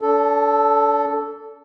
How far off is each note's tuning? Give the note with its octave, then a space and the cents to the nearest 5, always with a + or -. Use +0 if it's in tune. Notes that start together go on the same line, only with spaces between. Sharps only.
D4 -40 A4 +0